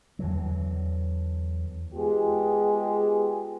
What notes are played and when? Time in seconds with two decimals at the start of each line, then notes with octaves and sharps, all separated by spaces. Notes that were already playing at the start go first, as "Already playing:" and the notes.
0.19 E2 D3 E3 F#3
1.94 G#3 B3 F4 G4 G#4